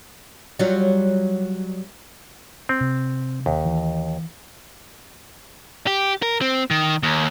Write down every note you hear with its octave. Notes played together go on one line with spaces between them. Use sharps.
F#3 G3 F4
C4
C3
D#2
E3
G4
A#4
C4
D#3
D#2